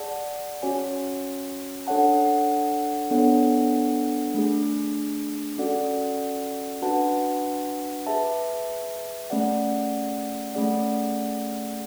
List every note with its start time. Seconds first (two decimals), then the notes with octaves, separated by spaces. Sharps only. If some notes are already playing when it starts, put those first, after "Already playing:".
Already playing: G#4 D5 F#5 A5
0.63 C#4 F#4 C#5 G#5
1.87 D4 A4 C#5 F#5 A5
3.11 B3 D4 A4 C#5 F#5
4.34 A3 D4 G#4
5.58 C#4 F#4 A4 D5 F#5
6.82 D4 F#4 B4 F#5 A5
8.07 G#4 B4 E5 A5
9.30 A3 C#4 G#4 D5 F#5
10.54 A3 C#4 G#4 D5 F#5